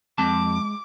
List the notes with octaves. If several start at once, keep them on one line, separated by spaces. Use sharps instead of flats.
F2 G#3 C4 A5 D6